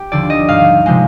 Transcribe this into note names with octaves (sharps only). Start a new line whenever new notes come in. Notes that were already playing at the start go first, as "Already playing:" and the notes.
Already playing: G4
D#2 D3 F3 D5
D#5
G#2 D#3 G3 F5
C3 F3 G#3